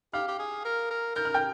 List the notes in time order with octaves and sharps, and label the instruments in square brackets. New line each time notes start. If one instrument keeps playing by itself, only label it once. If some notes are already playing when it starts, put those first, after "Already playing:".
[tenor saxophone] G4 [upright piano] F5 F6
[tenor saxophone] G4
G#4
A#4
A#4
[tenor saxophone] A#4 [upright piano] G6
[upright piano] F6
G5 G6